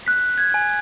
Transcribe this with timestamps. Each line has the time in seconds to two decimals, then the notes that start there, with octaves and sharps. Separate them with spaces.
0.06 F#6 B6
0.38 G#6
0.54 G#5